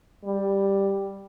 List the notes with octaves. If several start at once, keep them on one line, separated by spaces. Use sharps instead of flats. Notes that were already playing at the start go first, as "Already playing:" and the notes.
G3